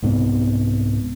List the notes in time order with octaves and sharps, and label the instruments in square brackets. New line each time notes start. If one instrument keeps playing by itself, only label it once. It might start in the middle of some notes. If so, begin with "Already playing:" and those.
[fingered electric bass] C2 G#2 C3 B3